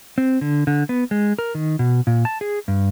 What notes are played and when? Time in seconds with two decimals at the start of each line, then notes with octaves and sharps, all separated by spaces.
0.18 C4
0.41 D3
0.67 D3
0.89 B3
1.11 G#3
1.39 A#4
1.55 D#3
1.79 B2
2.07 A#2
2.25 A5
2.41 G#4
2.68 G2